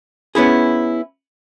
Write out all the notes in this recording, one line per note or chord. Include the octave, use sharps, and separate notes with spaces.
B3 C#4 E4 G#4